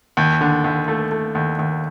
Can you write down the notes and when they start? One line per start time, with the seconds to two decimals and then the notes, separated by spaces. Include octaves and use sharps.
0.17 D#2
0.41 D3
0.64 D#2
0.88 A3
1.11 A3
1.35 D#2
1.59 D#2